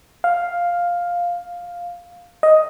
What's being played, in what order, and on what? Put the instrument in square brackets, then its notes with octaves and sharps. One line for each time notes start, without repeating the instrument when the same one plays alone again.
[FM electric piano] F5
D#5